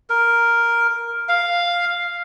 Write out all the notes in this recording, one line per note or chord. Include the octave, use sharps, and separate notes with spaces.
A#4
F5